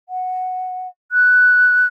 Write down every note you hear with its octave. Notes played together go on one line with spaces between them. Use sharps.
F#5
F#6